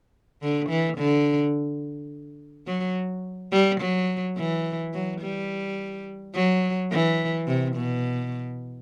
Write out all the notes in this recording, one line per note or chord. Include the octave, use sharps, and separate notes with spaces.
D3
E3
D3
F#3
G3
F#3
E3
F#3
G3
F#3
E3
C3
B2